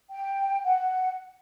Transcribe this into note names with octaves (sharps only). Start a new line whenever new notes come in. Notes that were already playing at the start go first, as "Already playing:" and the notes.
G5
F#5